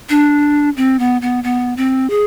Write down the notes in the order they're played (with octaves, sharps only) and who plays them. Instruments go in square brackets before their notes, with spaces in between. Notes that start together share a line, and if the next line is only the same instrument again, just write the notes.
[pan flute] D4
C4
B3
B3
B3
C4
G#4